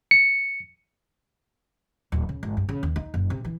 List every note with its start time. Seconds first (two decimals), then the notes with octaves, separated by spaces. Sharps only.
0.11 C#7
2.12 D1
2.29 C#3
2.43 G#1
2.57 G2
2.69 C#3
2.83 D#2
2.96 D#4
3.14 F#1
3.30 C3
3.45 E3